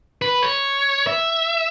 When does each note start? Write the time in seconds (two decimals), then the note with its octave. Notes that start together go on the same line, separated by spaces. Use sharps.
0.22 B4
0.42 C#5
1.07 E5